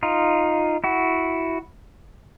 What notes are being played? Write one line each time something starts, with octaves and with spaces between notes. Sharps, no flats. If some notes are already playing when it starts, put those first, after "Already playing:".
D#4 F4
E4 F#4